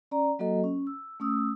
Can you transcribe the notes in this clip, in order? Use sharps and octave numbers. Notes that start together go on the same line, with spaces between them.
C#4 D5 A#5
F#3 A#3 F#4 A4 D#5
C#4
E6
A3 C#4 D#6 E6